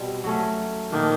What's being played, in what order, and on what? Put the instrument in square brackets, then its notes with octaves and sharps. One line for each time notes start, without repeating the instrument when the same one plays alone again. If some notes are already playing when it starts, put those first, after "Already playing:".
Already playing: [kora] B2 G3 C4
F#3 A3 C#4
[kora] A#2 F3 A#3 D4 [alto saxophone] D#3